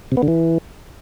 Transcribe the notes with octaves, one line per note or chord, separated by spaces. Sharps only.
C3
B3
D3
E3